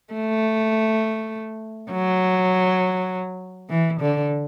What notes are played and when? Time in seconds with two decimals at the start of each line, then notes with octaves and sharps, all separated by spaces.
0.14 A3
1.92 F#3
3.70 E3
4.00 D3